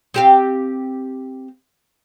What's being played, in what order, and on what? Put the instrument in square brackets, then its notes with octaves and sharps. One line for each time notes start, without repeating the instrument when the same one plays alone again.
[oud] C4 G4 F5